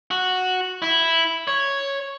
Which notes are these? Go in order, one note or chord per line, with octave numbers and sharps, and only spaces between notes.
F#4
E4
C#5